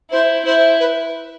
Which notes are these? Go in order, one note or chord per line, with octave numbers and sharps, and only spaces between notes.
E4 C5
E4 C5
B4